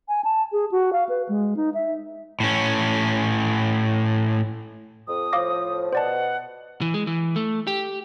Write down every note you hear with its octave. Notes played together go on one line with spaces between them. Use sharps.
G#5
A5
G#4
F#4
F5
B4
G#3
D#4
E5
A2 C#4
F2 D#6
A2 F3 F5 D6 A#6
B2 C5 D5 F#5 A5
E3
G#3
E3
A3
G4